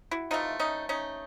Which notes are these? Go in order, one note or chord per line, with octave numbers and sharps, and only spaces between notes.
E4 F#4
C3 E3 A3 D#4 F4
C#4 D#4
C#4 D#4